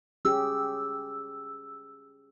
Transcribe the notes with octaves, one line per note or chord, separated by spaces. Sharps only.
C#4 G4 G#4 E6